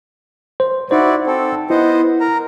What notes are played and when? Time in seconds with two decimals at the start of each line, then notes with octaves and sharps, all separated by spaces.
0.60 C5
0.91 D#4 E4 F#4 C5 D5
1.26 C4 A4
1.70 B3 E4 C5 D#5
2.21 A#4 A#5